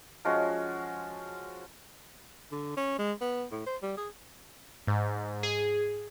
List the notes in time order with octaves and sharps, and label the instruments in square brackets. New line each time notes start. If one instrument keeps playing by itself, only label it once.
[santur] F3 G#3 C#4 F#4
[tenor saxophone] D3
C#4
G#3
B3
A2
C5
G3
G#4
[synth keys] G#2
G#4